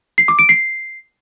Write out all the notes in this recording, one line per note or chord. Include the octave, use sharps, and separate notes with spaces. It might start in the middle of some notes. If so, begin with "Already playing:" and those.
C7
D6
D7
C7